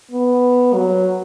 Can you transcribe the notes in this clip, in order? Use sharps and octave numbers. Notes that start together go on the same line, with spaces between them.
B3
F#3